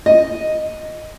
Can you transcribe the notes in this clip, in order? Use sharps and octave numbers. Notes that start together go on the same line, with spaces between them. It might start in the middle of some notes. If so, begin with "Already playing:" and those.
D#5